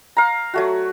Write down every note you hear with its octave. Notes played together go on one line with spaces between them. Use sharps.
F5 A#5
F#3 A3 F#4